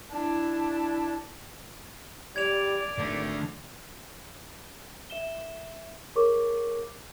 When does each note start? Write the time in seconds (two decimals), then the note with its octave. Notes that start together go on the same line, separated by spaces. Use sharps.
0.12 D4 E4
2.36 G3 D5 G#6 F7
2.98 G#1 D3 A3
5.10 E5 E7 G7
6.15 G#4 A#4 C#5 C#6 D6